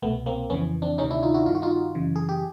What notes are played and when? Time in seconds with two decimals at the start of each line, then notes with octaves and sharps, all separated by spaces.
0.02 C2 B2 A3 B3
0.26 A#3 C4
0.50 F2 C#3 E3 B3 C#4
0.82 C4 D4
0.98 D2 C3 D#3 C#4 D#4
1.11 D4 E4
1.23 D#4 F4
1.34 E4 F#4
1.46 G2 D#3 F4
1.55 F#4
1.62 D#4 F4
1.95 F#2 C#3 E3
2.16 G#4
2.29 G4